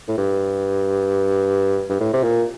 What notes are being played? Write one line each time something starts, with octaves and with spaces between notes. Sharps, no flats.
A2
G2
G2
A2
C3
A#2